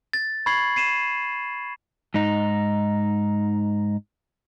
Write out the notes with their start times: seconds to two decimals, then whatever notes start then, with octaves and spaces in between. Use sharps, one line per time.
0.13 A6
0.46 B5 C#6 G#6 C7 F#7
0.76 C7 D#7 E7
2.14 G#2 D#4